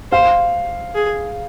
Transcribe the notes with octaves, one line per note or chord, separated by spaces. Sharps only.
C5 F5
G#4